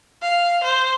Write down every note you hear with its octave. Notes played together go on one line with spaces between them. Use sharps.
F5
C5